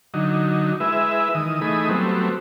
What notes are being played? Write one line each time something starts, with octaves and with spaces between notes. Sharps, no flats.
D3 F#3 D#4
G#3 E4 B4 E5
D#3 E3 D#6
E3 A3 D#4 G#4 B5 D#6
F#3 G3 A3 B3 C4